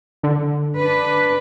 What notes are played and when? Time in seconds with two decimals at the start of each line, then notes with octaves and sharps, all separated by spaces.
0.23 D3
0.76 D4 B4